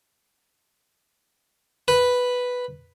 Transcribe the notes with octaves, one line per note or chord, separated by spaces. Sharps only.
B4